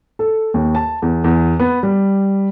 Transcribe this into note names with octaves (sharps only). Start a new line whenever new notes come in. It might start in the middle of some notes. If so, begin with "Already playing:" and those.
A4
D#2
A5
E2
E2
B3
G3